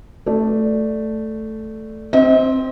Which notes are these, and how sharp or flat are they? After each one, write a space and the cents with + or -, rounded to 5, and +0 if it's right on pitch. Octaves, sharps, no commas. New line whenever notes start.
A3 +0 D5 +0
C4 +0 D#5 +40